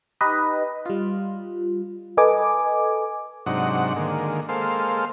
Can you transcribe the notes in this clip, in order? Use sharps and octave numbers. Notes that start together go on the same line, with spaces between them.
D#4 G4 B4 D#5
G3 F4
A4 B4 D#5 G#5 D6
G#2 C3 F#3 D4 D#4 F#5
D3 D#3 G#3 A#3
G#3 A#3 A4 C5 F5